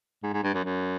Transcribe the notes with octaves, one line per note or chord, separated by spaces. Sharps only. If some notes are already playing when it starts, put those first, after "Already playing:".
G#2
G#2
G2
F#2
F#2